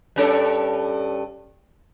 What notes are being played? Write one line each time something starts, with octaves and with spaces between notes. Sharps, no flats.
G2 C#4 A4